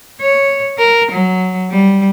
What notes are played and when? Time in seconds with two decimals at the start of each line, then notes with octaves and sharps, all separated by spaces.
0.21 C#5
0.78 A#4
1.11 F#3
1.70 G3